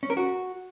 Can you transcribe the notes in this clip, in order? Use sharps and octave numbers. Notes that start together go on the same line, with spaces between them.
C#4
A#4
F#4